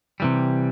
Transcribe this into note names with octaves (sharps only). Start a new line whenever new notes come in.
C3 E3 G3